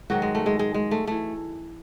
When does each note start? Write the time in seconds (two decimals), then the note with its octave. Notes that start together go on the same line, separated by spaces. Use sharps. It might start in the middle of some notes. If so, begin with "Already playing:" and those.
0.10 G#2 D#3 F#3 F#4
0.22 G#3
0.35 A3
0.46 G#3
0.59 G#3
0.74 G#3
0.91 A3
1.07 E3 A3